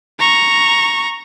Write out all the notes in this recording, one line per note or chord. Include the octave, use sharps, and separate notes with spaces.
A#5 C#6